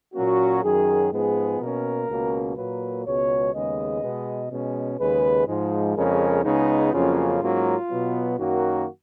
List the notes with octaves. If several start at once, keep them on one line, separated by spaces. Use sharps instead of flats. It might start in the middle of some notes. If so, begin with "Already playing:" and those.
A#2 F#3 A#3 C#4 F#4
F#2 D#3 F#3 G#4
G#2 F3 G#3 B3 G#4
B2 A#3 C#4 A#4
C#2 B2 A#3 C#4
A#2 F#3 A#3 B4
C#2 B2 G#3 B3 C#5
D#2 C#3 G#3 B3 D#5
B2 G#3 B3
B2 G#3 C#4
D#2 C#3 G#3 B4
G#2 F3 G#3
F2 C#3 G#3 C#4 A#4
C#2 C#3 G#3 B3 D#4
F2 C#3 F#3 A#3 C#4 F4
G#2 F#3 A#3 C#4
B2 F#3 B3
F#2 D#3 F#3 A#3 F#4